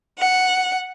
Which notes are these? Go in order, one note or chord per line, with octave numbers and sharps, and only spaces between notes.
F#5